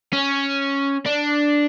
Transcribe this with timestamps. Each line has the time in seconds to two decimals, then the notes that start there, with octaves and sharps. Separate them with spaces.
0.13 C#4
1.06 D4